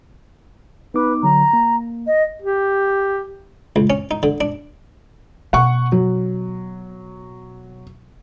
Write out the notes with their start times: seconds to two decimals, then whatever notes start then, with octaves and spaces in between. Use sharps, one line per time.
0.94 B3 D#4 B4 D6
1.23 D3 F#3 A#5
1.53 A#3
2.07 D#5
2.42 G4
3.76 C#2
3.90 C#4
4.11 D#4
4.23 D3
4.41 D4
5.53 B2 F#5 C#6
5.92 F#3